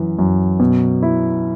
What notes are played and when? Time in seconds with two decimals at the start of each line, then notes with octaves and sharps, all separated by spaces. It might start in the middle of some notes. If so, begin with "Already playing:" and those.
Already playing: F#2 E3
0.19 F#2
0.60 B2
1.02 E4